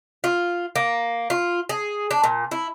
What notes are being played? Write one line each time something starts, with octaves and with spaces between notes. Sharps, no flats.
F4
A#3
F4
G#4
D4
A#2
E4